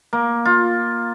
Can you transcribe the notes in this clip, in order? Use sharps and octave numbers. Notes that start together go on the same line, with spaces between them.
A#3
F4